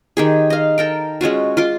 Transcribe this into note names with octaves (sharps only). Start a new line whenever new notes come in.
D#3 G4 G#4
D#5 F5
A4 A#4 G5
G#3 C#4 F4 F#4
F4 C6 D6